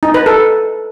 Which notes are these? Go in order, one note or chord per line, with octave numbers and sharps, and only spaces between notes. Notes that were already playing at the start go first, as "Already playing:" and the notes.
D#4
B4
A4